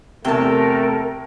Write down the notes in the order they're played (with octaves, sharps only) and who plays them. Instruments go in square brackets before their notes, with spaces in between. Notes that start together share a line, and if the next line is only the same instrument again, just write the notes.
[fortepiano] E2 C3 [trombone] A3 [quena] A#4 [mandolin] G5 A5